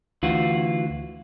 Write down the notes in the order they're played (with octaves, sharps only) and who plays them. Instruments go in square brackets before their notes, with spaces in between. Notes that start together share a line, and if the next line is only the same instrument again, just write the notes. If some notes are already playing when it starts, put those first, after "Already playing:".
[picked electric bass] D2 [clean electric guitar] E3 F4 F#4